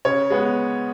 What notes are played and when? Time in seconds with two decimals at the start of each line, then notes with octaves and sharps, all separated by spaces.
0.05 C#3 C#5
0.31 G#3 B3